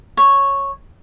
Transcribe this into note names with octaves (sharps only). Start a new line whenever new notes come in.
C#5